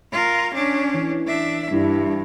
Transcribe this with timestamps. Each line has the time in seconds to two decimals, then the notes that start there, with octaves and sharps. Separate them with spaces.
0.12 F4 A#4
0.54 C#4 D4
0.94 E3
1.27 D4 E5
1.71 G2 G3 D4 E4